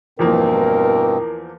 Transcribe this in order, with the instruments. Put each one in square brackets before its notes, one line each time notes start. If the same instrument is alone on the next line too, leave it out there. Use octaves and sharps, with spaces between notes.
[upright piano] E2 F3 A#3 [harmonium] G2 B2 C4 [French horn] A#4